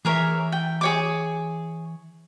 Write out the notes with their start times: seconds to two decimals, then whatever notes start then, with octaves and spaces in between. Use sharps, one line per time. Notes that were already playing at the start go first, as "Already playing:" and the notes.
0.05 E3 G#4 A#4 C#5 E5
0.52 G5
0.81 G#4 C#5 D6